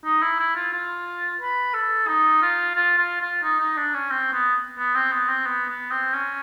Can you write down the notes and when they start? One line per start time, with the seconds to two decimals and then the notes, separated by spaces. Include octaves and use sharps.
0.05 D#4
0.22 E4
0.39 E4
0.56 F4
0.73 F4
1.41 B4
1.74 A4
2.07 D#4
2.42 F4
2.75 F4
2.98 F4
3.21 F4
3.43 D#4
3.60 D#4
3.77 D4
3.94 C#4
4.11 C4
4.33 B3
4.78 B3
4.96 C4
5.12 B3
5.29 C4
5.46 B3
5.69 B3
5.91 C4
6.13 C#4